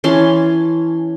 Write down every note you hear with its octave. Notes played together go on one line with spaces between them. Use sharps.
E3 C#4 A5 C6